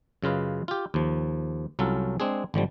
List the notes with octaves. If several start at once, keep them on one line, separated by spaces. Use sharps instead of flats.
F#2 C#3 F4 B4 D#5
F4 G4
D#2 F3
C2 F#3 C#4 F4 A4
G#3 C4 D4 G#4
G#1 D3 F3 G3